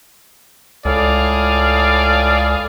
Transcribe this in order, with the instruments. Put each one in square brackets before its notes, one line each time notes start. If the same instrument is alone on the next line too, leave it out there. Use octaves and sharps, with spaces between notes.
[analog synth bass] C#2 [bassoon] A2 [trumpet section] G#4 F5 [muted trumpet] D5